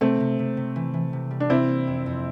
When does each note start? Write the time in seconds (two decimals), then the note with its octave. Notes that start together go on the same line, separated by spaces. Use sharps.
0.01 C3 A3 C4
0.20 C3
0.39 C3
0.57 C3
0.76 E3
0.94 E3
1.13 C3
1.31 G3
1.40 D4
1.50 C3 C4 E4
1.68 A#3
1.87 F2
2.06 F2